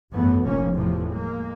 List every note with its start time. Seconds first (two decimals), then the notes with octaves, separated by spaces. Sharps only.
0.13 G#1 F#2 E3 A3 B3
0.44 F1 A#1 A#2 A#3 C#4
0.73 E2 A2 C3 F3
1.11 G#3 A#3